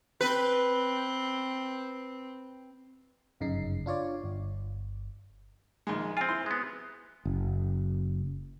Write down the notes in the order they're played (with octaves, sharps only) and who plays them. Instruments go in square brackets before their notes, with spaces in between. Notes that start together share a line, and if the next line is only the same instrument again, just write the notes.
[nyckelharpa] C4 [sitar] B4
[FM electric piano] G1 F#2 C#3 D#4 C7
D4 F4 C#5 D5
G1
[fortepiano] A#1 D#3 G#3
[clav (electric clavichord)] C4 F4 [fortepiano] G#5
[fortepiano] E4 C6
[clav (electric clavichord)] G#3 B3
[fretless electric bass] F#1